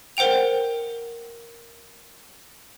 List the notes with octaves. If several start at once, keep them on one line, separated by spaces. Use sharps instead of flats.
A#4 C5 F#5 G5 F7